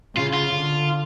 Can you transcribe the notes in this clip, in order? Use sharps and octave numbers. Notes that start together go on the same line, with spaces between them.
C#3 F4
F4
D3